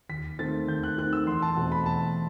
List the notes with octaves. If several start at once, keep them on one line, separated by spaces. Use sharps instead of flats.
D#2 B6
D#3 A3 C4 A6
D#2 G6
F#6
D#3 A3 C4 F#6
E6
E2 C6
A5
B2 A3 C4
B5
E2 A5